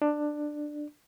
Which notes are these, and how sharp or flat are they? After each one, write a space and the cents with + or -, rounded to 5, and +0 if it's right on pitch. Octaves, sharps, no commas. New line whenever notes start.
D4 +15